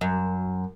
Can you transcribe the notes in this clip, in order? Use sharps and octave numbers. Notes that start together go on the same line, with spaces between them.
F#2